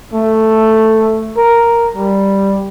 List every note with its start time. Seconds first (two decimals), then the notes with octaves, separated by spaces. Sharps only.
0.14 A3
1.37 A#4
1.96 G3